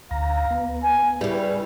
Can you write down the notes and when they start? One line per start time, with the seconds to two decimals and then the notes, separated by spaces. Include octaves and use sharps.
0.11 D2 F5 A#5
0.51 B3
0.83 G#5
1.21 C#3 G3 E4 G#4 B4